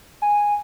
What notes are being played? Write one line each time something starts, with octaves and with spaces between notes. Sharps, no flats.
G#5